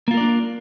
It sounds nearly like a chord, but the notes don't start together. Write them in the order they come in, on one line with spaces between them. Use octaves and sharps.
A#3 F4 A#4 D5 D4